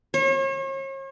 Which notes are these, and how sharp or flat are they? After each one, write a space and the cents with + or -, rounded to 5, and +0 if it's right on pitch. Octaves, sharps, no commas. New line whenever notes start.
C#5 -40